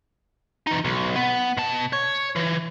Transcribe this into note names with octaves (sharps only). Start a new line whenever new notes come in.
E3 D#4
B1
B3
B2 A5
C#5
E3